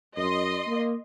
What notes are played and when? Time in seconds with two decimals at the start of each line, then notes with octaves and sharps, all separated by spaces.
0.17 F#2 D#5 C6
0.67 A#3